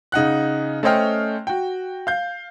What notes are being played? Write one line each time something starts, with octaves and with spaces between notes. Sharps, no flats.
C#3 D#4 F#5 F#6
A3 C#4 C5 D#5 G5 F6
F#4 G5
F5 G6